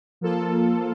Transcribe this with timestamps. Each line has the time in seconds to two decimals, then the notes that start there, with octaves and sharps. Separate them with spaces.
0.21 F3 A#3 F4 A4